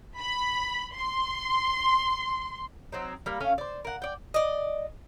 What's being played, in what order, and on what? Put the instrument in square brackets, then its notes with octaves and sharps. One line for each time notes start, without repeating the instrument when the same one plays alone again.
[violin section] B5
C6
[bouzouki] F#3 C4 D#4
G3 A#3
A3 C#4 F5 G#5
C5 D5
A#4 F#5
D5 G5
D5 D#5